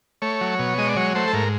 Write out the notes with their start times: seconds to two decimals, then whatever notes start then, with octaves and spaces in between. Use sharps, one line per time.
0.22 A3 C#5
0.41 F#3
0.59 B2
0.78 G#3 D#5
0.88 D5
0.96 F#3 C#5
1.15 A3 C5
1.28 A4
1.33 G#2 A#4